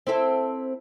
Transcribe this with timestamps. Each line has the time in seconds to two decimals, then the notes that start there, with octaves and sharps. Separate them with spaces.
0.07 C4 E4 A4